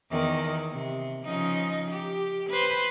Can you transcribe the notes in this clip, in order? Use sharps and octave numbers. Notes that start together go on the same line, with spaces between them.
E2 D#3
C3
C#3 F3 D#4
G4
B4 C5